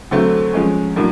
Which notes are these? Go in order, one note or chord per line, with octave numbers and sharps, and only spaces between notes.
D3 F#3 A3 C4
F3 G#3 C#4
A2 F#3 A#3 D4